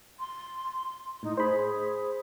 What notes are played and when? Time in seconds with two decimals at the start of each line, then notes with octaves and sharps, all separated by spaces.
0.20 C6
1.23 A2 D#4
1.37 G#4 C5 B5